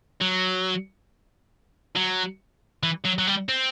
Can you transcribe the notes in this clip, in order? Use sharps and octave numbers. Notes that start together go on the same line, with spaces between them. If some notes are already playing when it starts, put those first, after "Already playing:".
F#3
F#3
E3
F#3
F#3
G3
C4